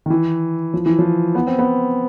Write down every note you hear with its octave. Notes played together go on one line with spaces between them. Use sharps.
D#3
E3
F3
E3
F3
B3
C4
B3